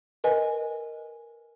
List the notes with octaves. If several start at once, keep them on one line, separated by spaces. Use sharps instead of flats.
A#4 B4 D#5 G#5